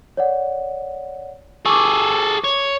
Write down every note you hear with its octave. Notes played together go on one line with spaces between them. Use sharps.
C#5 D5 F#5
G#4 A4 C#6 D6
C#5